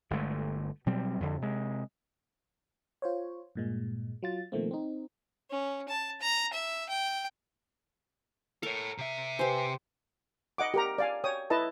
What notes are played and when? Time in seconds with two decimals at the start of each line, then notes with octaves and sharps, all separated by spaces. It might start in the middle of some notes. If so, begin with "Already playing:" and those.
0.11 G1 D3 G#3 A3
0.86 B2 F#3 G3 C4
1.20 F2 D3
1.42 C3 G#3
3.02 F4 C5 C#5
3.55 G2 A#2 G#3
4.23 F#3 F4 A6
4.52 B2 D#3 F3 A3 A#3 C4
4.71 C4 D#4
5.51 C#4
5.89 A5
6.21 A#5
6.53 E5
6.90 G5
8.63 A4 A#4 C#5
8.98 C3 E5
9.39 G4 B4 C5 G#5
10.58 D#5 F#5 D6
10.74 G4 A#4 A#5
10.98 D5 F5 G#5
11.24 C#5 G5 D#6
11.50 E4 B4 D#5 A5